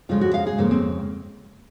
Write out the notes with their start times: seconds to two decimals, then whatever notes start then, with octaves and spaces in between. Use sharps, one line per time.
0.09 F2 C#3 G#3 F4
0.21 F#4
0.34 F5
0.47 G#4
0.58 F2 C#3 G#3 A#3
0.71 C4